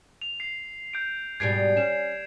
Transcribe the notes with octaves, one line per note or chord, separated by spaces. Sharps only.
F7
C7
G6 D7
G#2 B2 G3 G#6 C7 D7
C#4 E7